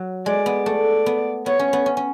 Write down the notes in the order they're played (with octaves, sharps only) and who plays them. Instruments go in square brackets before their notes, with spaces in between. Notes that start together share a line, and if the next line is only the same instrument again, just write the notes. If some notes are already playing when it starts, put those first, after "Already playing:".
Already playing: [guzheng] F#3
[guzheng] G#3 [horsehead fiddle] D5
[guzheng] B3
[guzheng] A3 [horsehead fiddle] D5
[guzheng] B3
[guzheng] B3 [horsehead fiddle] C#5
[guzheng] C#4
B3
C#4
C#4